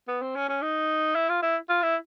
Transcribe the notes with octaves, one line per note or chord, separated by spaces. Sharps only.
B3
C4
C#4
C#4
D#4
E4
F4
E4
F4
E4